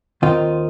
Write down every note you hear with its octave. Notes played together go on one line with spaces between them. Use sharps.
D#2 D#3 C4 D#4 F4